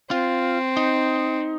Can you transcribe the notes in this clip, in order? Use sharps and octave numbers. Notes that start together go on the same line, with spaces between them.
C4 F4
D#4